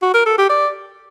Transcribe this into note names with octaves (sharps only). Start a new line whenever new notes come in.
F#4
A#4
A4
G4
D5